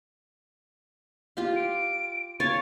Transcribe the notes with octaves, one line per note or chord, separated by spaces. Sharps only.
F4 G4 F5
D7
C#5 F5 G#5 A6